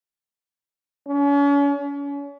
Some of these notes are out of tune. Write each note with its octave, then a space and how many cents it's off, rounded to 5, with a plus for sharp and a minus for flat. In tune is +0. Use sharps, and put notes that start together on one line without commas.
C#4 +40
C#4 +35